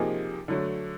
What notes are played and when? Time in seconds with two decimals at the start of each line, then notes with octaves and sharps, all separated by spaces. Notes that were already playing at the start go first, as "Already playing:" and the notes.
Already playing: C3 F3 A#3 D#4 G#4
0.48 D3 F#3 A3